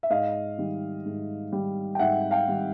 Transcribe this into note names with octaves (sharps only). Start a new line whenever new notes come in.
E5
G#2 D#5 F5
D#3 G3
G#2
D#3 G3
G5
G#2 E5 F#5
F5 G5
D#3 G3